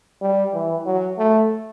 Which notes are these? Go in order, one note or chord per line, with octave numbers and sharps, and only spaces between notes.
G3
E3
F#3
A3